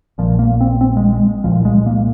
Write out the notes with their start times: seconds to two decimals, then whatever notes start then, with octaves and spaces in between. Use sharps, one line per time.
0.18 A#1 A#2 F3
0.39 A#3
0.61 C4
0.81 C4
0.97 G#3
1.13 G#3
1.44 C2 A#2 F3
1.65 G#3
1.86 A#3